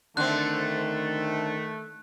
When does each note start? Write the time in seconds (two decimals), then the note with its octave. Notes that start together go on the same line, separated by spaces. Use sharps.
0.17 D3 D#3 A3 C4 F#6